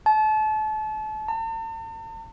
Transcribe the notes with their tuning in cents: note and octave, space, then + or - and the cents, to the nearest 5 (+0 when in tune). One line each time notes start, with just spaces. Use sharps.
A5 -35
A5 +45